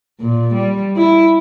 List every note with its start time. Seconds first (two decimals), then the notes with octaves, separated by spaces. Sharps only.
0.20 A#2
0.54 G3
0.97 E4